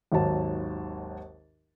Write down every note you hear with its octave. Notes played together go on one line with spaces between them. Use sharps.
G#1 D#2 F#3 C#5 A5